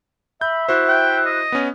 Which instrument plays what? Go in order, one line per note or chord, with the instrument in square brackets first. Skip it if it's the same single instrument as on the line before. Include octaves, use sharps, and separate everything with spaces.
[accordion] E5 [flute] B5 [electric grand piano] G6
[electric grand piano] E4 F#4 C5 [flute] F#6
[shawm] G5
D#5
[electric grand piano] B3 C#4